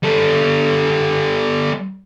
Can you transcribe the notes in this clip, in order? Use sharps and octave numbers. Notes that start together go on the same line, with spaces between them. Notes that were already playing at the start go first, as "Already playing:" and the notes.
G3 A4